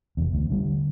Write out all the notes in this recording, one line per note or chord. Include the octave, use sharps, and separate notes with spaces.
F1 E2
D2
D3 F#3 G3